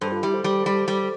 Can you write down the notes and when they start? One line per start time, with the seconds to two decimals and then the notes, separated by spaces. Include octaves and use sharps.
0.01 G2 A4 C5
0.12 F4 A4
0.23 G3 E4 G4
0.34 A4 C5
0.44 G3
0.66 G3
0.88 G3